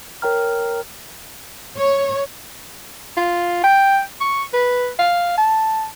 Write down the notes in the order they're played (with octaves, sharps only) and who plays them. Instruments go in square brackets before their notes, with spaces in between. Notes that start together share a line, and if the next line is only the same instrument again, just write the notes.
[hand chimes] A#4 C#5 G5 A#5 F6
[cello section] C#5
[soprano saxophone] F4
G5
C#6
B4
F5
A5